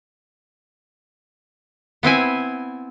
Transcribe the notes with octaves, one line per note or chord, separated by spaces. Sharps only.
B3 C4 E4 G#5